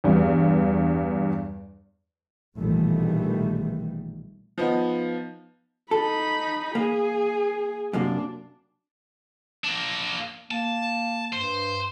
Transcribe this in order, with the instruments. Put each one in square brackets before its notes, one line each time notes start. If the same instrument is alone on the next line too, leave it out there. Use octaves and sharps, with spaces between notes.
[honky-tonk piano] E2 G2
[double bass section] A#1 B2 D#3 E3 G3 A3
[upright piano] F3 B3 D#4
[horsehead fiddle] D#4 B5 [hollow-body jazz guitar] A4
[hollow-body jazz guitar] A#3 [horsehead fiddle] G#4
[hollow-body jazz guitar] F#2 C3 A#3 [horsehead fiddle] D4
[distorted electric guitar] A#3 D4
[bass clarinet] A#3 [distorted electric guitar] A5
[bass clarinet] G2 [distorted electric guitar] C5